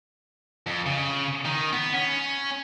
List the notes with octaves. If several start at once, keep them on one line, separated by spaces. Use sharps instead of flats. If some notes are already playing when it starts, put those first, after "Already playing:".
F2
C#3
D#3
B3
C#4